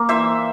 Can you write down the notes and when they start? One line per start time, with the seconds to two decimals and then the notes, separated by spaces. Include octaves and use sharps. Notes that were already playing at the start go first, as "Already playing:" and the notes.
Already playing: A#3
0.09 E3 C5 E5